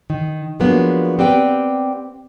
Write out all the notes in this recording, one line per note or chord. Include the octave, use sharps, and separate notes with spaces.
D#3
F3 F#3 G#3 A#3 B3 D4
C4 G4 B4 D5 F#5 G5